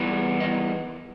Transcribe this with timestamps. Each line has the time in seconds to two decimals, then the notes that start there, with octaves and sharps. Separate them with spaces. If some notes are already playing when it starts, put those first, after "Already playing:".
Already playing: E3 G3 B3
0.40 D#5